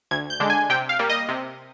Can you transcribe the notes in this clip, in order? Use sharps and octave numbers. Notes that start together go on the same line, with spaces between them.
D2 G#6
G6
D3 G#3 D4
G#5
C3 G5
F5
G3 A#3
D#5
C3